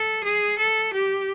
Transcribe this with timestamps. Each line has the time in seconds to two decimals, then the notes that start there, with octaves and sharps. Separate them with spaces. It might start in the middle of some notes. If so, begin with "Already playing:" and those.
Already playing: A4
0.24 G#4
0.59 A4
0.93 G4